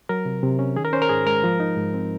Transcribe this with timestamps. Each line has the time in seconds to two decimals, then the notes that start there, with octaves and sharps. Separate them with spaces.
0.09 F#3 A#4
0.25 C3
0.43 C3
0.59 C#4
0.76 D#3 G#4
0.85 A#4
0.93 C#4 C5
1.02 A#4
1.09 G#2 G#4
1.26 G#3 A#4
1.44 F3
1.60 D#4
1.77 G#2
1.94 C4